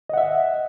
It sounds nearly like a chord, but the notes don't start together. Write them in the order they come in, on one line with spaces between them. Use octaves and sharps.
D#5 F#5 E5